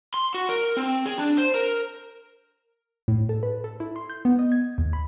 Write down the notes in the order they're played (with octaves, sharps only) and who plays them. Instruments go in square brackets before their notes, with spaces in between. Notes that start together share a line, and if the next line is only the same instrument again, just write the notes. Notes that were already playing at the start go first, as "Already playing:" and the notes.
[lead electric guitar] C6
F#4
A#4
C4
G#4
D4
C5
A#4
[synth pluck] A2
A4
B4
A4
E4
C6
G6
B3
D#5
G#6
D#2
B5